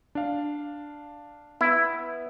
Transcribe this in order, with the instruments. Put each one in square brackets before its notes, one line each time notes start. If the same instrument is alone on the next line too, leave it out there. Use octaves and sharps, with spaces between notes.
[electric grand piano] D4 F5
[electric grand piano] B3 [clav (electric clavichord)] E4